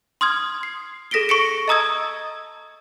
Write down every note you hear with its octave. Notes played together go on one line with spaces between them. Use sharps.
C6 D#6 F6 G#6
C7
G#4 A4 A#6 B6 D7 G7
C#6 A#6 C#7 D7
D#5 A5 A#5 D#6 E6 G#6